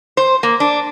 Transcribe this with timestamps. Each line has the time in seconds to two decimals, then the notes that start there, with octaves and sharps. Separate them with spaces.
0.17 C5
0.43 A#3
0.60 D4